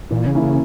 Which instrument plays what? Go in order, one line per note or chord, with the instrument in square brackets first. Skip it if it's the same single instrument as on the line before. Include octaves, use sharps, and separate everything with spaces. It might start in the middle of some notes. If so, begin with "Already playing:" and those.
[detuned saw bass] A#2 [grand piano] E3
[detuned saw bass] C#3
[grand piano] A#3 C#4 E4
[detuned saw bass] C#3